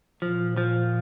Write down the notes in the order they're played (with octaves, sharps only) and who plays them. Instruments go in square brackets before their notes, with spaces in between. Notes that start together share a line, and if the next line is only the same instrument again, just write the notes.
[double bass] A#2 [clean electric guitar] F3
[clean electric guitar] F3